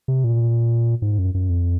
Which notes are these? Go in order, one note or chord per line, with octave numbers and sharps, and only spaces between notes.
C3
A#2
G#2
F#2
F#2
F2